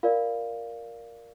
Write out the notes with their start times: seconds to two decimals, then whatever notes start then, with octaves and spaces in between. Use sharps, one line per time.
0.03 F4 A#4 D5 F5